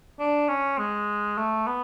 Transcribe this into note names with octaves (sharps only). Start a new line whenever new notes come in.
D4
C#4
G#3
A3
B3